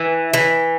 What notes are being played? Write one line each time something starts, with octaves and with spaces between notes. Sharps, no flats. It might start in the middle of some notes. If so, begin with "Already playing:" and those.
Already playing: E3
E3